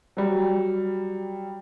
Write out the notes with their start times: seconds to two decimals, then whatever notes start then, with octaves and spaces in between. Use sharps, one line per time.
0.17 F#3 G3